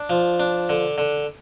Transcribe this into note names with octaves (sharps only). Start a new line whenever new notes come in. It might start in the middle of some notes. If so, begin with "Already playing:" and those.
Already playing: D4
F3
D4
D3
D3